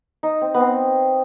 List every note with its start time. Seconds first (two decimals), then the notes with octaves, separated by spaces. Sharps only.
0.23 D#4
0.41 C4
0.54 B3
0.60 C4